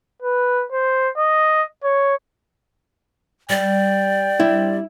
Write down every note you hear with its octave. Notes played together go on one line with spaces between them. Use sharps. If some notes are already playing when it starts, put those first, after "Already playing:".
B4
C5
D#5
C#5
G3 D5 G5
G3 C4 D4 E4